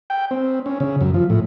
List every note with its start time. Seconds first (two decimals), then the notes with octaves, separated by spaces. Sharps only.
0.10 G5
0.31 C4
0.66 C#4
0.80 C#3
1.01 F#2
1.14 F3
1.30 A2